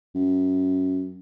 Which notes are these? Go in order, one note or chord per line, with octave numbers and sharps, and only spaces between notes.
F#2